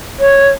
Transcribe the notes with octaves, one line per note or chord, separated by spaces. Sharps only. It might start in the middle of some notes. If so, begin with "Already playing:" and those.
C#5